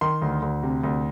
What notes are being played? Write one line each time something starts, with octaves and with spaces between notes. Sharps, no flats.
D#3 C6
D2
D2
C3
D2